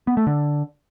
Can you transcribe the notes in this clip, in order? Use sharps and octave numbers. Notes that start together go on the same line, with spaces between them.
B3
A3
D3